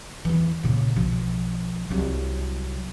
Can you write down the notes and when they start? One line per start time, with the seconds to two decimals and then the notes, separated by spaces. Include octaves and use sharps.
0.25 E2 E3
0.63 A#2 C#3
0.96 B1 F3
1.90 C2 F#3